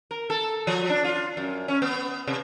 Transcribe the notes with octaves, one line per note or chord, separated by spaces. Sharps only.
A#4
A4
F3
D4
F4
F#2
C#4
B3
C3